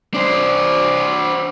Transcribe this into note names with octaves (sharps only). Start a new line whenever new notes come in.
D4 C5